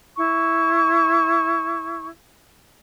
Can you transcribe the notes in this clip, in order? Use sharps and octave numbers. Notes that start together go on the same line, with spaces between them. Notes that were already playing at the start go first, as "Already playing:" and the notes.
E4 C#6